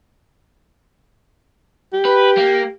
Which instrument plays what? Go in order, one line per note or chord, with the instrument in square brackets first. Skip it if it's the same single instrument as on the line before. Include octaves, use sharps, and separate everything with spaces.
[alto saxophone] G4
[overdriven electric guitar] B4
A#3